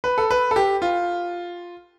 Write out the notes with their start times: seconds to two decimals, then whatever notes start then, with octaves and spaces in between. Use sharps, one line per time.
0.04 B4
0.18 A4
0.31 B4
0.51 A4
0.56 G4
0.82 F4